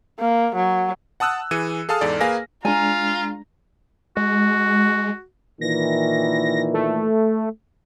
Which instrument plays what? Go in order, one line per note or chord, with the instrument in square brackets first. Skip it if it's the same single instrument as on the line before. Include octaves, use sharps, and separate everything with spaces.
[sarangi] A#3
F#3
[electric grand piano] F#5 A5 D#6 E6 F#6
E3 G#4 E6 C#7 D#7
G#4 A4 F5 A5 D#6 F6
E2 G#2 A4 D5
A#3 G#4 B4 F5 G#5 A#6
[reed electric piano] G#3 D4 [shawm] F4 [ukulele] G#5 [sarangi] A#5
[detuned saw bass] G#3 [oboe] F#4
[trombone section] A#2 D#3 E3 [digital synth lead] A#6
[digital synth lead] A3